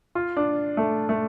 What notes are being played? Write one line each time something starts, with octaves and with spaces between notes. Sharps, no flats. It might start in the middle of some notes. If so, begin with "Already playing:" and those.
F4
D4
A3
A3